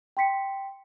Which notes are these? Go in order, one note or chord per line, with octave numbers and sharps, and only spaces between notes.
G5 C6 B6 C#7